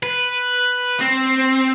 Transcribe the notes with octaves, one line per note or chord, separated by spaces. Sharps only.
B4
C4